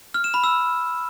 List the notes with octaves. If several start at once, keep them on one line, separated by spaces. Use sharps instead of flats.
F6
E7
B5
E6